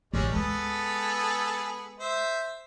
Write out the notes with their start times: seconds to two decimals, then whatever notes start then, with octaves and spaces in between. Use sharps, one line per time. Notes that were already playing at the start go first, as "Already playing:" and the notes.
0.13 A1 D2 G3 G#3 C#4
0.32 G#3 B3 G#4 A4
2.00 C5 E5